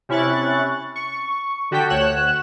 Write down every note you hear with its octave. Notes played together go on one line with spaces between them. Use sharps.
C3 C#4 E4 C#6 F#6 A6
C#6
D3 F#4 G4 A4 G5 B6
D2 C#5 F#5 F#6 E7